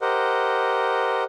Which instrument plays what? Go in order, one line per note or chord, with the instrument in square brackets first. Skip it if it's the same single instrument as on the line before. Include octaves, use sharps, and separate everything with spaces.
[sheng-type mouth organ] G4 A#4 C5 D#5 F#5